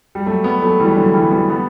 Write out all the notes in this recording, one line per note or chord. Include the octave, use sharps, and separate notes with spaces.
G3
F#3 A3
G3 B3
F#3 A3
E3 G3
G3
D3 F#3
E3 G3
G3 B3
G3 B3